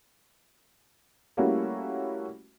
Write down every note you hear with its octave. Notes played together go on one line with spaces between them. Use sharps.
G3 A3 A#3 C#4 E4 F#4